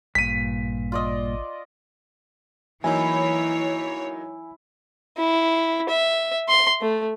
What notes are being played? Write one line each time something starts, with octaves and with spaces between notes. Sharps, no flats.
A1 G2 A#2 B6 D#7
F4 D5 D#5
E3 F#3 A#3 D#4 E4 C#5 G#5
E4
E5
C6
A3